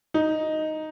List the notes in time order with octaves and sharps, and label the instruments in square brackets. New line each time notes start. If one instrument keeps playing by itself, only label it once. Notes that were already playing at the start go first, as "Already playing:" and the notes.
[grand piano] D#4